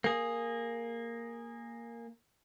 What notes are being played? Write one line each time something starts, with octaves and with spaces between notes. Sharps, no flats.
A#3 G#4